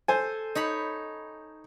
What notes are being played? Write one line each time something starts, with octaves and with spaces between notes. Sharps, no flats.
A4 C5 G#5
D#4 C#5 B5